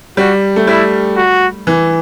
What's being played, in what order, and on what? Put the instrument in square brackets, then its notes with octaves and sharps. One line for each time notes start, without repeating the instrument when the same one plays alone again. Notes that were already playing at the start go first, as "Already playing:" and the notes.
[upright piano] G3 [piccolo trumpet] F#4
[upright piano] A3
[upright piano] G3 [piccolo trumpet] E4
[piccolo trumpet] F#4
[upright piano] E3